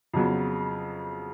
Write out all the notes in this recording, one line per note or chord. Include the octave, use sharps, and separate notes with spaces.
F2 C#3 F#3 B3